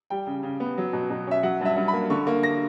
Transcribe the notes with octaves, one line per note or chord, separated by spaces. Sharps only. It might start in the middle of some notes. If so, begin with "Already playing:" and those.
G3 G5
C#3
C#3
B3
F#3
B2
B2
C#4 E5
F#3 F#5
G2 E5
G2
B5
A#3
D3 C#6
A#3
A#6